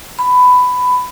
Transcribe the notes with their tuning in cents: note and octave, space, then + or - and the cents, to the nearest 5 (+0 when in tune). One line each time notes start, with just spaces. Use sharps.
B5 +15